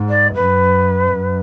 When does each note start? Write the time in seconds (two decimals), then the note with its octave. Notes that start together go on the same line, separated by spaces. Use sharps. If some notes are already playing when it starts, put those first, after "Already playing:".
Already playing: G#2
0.09 D5
0.34 F#2 B4
1.12 F#2